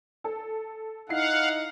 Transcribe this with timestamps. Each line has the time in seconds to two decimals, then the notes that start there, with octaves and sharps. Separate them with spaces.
0.24 A4
1.09 D#4 E4 F5 F#5 C7